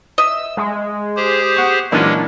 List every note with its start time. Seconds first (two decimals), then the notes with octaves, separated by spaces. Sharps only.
0.18 D#5 E5 E6
0.57 G#3
1.17 G4 G#4 C5
1.56 F#5 C#6
1.92 A#2 E3 F#3 G#3 C#4 D4